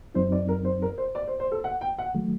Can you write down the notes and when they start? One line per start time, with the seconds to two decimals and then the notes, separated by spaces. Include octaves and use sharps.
0.15 F#2 F#3 C4 D#4 C5
0.32 D5
0.48 A#4
0.65 C5
0.82 A#4
0.98 C5
1.15 D5
1.27 C5
1.40 C5
1.52 A4
1.64 F#5
1.81 G5
1.98 F#5
2.15 D#3 F#3 A3